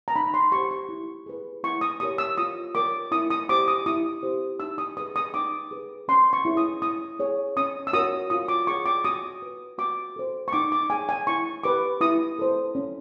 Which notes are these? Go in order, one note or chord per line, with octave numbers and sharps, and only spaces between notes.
A#5
D#4 B5
C6
G4 C5 C#6
C#6
E4
G#4 B4
E4 C#6
D#6
G4 A#4 C#5 D#6
E6
F4 D#6
A#4 C#5 D6
E4 D#6
D#6
G4 C5 D6
D#6
E4 D#6
G4 C5
D#4 E6
D#6
G#4 B4 D#6
D#6
D#4 D6
G#4 B4
C#4 C6
C#6
E4 G#4 C#5
D#6
E4 D#6
G#4 C#5
C#4 D#6
E6
F#4 A#4 C#5 D#6
F4 D#6
D6
G#4 C#5 C#6
D6
F#4 D#6
B4
F#4 D6
A4 C5
C#6
D#4 D6
D6
G#4 C#5 G#5
G#5
E4 C#6
G4 B4 D6
E4 D#6
A4 C5
C#4